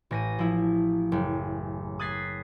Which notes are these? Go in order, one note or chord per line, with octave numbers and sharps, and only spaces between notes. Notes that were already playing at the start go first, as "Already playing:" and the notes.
A1 A#6 D#7
F3 E4
F#1
D#6 F#6 G#6 A6 B6 C7